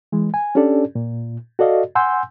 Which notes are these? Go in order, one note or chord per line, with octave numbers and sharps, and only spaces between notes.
E3 G#3
G#5
C#4 D4 G4 A4 D5
A#2
F#4 A4 D5 D#5 F5
F#5 G#5 C6 E6 G6